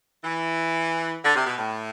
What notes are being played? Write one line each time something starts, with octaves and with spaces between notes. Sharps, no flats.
E3
D3
C3
B2
A2